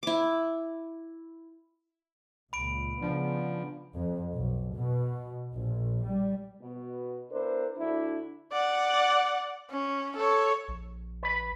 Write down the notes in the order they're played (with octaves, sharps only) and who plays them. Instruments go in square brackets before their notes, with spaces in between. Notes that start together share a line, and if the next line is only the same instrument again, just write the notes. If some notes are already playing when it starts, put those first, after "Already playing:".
[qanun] E4 D6
[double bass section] C#2 A#2 [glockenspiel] B5 D7
[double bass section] C#3 B3 [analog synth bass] F3 [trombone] D4
[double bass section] F2
B1
B2
A#1
G3
[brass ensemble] B2
B3 D4 E4 A#4 C5
D2 D4 E4
[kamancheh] D5 F#5
C#4
A4 C#5
[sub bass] A#1
[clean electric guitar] B4 B5